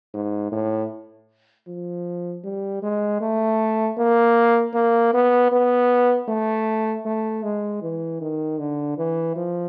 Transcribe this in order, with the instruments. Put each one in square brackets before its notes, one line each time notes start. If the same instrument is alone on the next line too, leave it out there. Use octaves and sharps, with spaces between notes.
[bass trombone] G#2
A2
F3
G3
G#3
A3
A#3
A#3
B3
B3
A3
A3
G#3
E3
D#3
D3
E3
F3